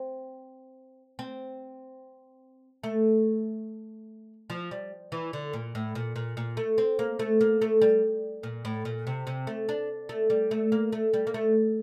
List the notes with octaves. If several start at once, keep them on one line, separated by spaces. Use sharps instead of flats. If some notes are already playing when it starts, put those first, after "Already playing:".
Already playing: C4
C4
A3
F3
G3
E3
D3
A#2
A2
A#2
A#2
A#2
A3
C4
A#3
A3
A#3
A3
G3
A#2
A2
A#2
C3
C3
A3
D4
A3
G3
A3
A#3
A3
G3
A#3
A3